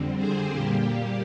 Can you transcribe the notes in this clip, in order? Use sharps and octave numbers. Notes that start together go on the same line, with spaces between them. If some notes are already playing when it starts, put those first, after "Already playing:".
Already playing: F2 D3 G3 C4
G#4 C5
A#2 G3 A#3 G4